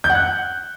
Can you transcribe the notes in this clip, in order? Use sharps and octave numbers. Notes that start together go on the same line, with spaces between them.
G6
F#5
F#6